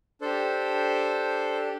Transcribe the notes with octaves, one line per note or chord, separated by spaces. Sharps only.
D4 G4 A4 C5